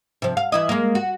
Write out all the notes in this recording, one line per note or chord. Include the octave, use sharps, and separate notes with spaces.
C3 F3
F5
E3 E4 D#5
G#3 A#3
F#4